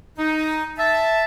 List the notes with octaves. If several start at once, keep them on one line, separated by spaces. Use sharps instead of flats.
D#4
E5 A5